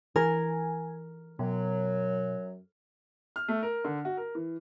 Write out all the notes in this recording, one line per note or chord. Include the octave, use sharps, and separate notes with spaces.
E3 A#4 G#5
F#2 B2 F#3
F6
A3
A#4
D3
F#4
A#4
E3